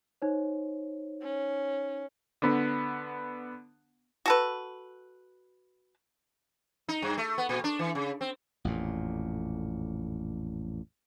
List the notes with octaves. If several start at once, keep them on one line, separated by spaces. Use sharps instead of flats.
D#4 C5 C#5
C#4
D3 B3
F#4 A4 B4
D#4
G2
A3
B3
A#2
D4
E3
C#3
C4
A1 F2 A#2